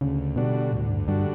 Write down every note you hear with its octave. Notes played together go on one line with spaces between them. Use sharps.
D2 C#3
B2 D3 G3 D4 F#4
D2 A2
G2
G2 D3 G3 D4 F#4